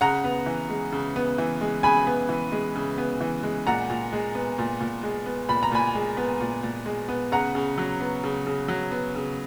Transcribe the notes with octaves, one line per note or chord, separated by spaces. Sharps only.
C#3 F#5 A#5
B3
E3
G#3
C#3
B3
E3
G#3
C#3 G#5 B5
B3
E3
G#3
C#3
B3
E3
G#3
A#2 F#5 A#5
A#2
G#3
B3
A#2
A#2
G#3
B3
A#2 B5
A#5
A#2 G#5 B5
G#3
B3
A#2
A#2
G#3
B3
C#3 F#5 A#5
C#3
F#3
B3
C#3
C#3
F#3
B3
C#3